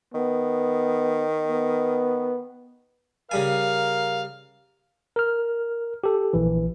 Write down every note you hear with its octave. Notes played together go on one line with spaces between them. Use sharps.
D#3 B3
B3
C#3 G3 A#4 F5 G#5
A#4 F6
G4 A4
A#1 E3